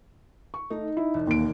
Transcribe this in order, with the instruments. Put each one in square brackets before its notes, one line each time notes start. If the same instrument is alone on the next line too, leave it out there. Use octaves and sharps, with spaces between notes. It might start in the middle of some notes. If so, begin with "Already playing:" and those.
[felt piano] C#6
[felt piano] A3 [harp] D#4
[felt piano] E4
[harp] E1
[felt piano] D#2 D7 [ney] A#3